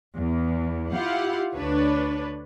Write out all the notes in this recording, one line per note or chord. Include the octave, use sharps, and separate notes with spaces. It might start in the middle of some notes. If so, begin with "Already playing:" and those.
E2
E4 F4 G4 F5 F#5
D2 D4 B4 C#5